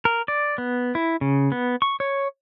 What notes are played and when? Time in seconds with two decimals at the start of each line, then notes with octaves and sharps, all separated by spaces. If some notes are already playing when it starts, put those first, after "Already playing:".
0.05 A#4
0.28 D5
0.58 B3
0.95 E4
1.21 C#3
1.52 B3
1.82 C#6
2.00 C#5